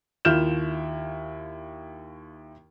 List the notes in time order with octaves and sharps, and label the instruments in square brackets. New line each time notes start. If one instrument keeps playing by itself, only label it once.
[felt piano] D#2 E4 F4 F6 G6 E7